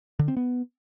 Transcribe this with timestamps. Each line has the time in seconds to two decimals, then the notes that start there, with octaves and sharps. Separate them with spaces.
0.19 D3
0.28 C4
0.37 B3